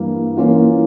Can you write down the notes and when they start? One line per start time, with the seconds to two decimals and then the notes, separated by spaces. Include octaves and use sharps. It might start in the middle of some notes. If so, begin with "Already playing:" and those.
Already playing: G2 E3 A#3
0.37 E3 A#3 C#4 F4